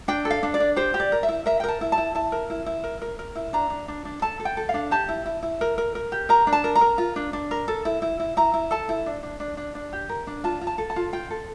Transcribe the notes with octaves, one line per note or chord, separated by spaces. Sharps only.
D4 G5
A4
F5
D4
D5
D4
G4 C5
G4
D5
A#4
E5
E4
A#4 E5
G5
A#4 A5
E4
A5
E4
E4 A5
A#4
E4
E4
A#4
A#4
A#4
E4
D4 A#5
D4
D4
D4
A4 A5
A4
G5
A4
F5
D4
G4 A5
E4
E4
E4
A#4
A#4
A#4
G4
A#4 A#5
D4
A5
A#4
A#5
A#4
F4
D4
D4
A#4
A4
E4
E4
E4
E4 A#5
E4
A4 A5
E4
D4
D4
D4
D4
D4
G4
A#4
D4
F4 A5
F4
A5
A4
A5
F4
F4 G5
A4